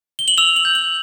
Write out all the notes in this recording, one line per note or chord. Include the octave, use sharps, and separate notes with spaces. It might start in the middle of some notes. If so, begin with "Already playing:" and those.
G7
F#7
E6 F7
F#7
G6
F#7